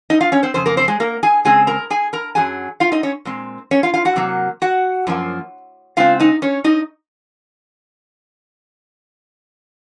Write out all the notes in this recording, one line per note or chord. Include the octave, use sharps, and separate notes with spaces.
D#4 D#5
F4 F5
C#4 C#5
C4 C5
F2 C#3 C5
A#3 A#4
C4 C5
G#3 G#4
A#3 A#4
G#4 G#5
C#3 G#3 C4 G#4 G#5
A#4 A#5
G#4 G#5
A#4 A#5
F#2 D#3 F#3 G#4 G#5
F4 F5
D#4 D#5
C#4 C#5
A#2 G#3 C4
C#4 C#5
F4 F5
F4 F5
F#4 F#5
C3 F#3 A#3
F#4 F#5
F#2 F3 A#3
C#3 G#3 C4 F4 F5
D#4 D#5
C#4 C#5
D#4 D#5